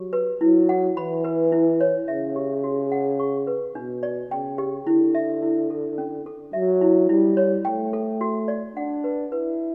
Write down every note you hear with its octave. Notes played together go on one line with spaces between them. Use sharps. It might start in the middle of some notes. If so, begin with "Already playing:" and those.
Already playing: F#3 G4
B4
F#3 E4
F#5
E3 B5
B4
E4
C#5
C#3 E5
G4
F#4
F#5
C#6
B4
B2 D4
D5
C#3 G5
G4
D3 E4
E5
E4
A4
C#4
A4
F#3 E5
E4
G3 E4
C#5
A3 G5
A4
F#4
D5
D4 F#5
B4
E4 B4